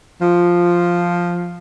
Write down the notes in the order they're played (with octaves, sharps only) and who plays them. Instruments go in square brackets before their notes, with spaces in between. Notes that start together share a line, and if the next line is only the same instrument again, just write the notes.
[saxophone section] F3